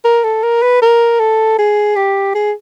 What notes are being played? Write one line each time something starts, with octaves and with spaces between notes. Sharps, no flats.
A#4
A4
A#4
B4
A#4
A4
G#4
G4
G#4